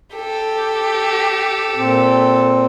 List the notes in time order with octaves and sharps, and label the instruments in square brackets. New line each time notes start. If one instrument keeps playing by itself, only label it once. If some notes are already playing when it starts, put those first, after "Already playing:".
[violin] G4 [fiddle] A4
[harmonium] A#2 C4